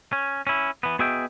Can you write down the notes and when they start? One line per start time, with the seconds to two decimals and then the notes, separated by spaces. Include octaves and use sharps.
0.13 C#4
0.47 C#4 E4
0.83 E3 B3
0.99 B3 F#4 G#4 D#5 E5 G5